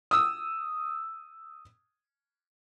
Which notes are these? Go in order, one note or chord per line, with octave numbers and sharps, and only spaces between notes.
D#6 E6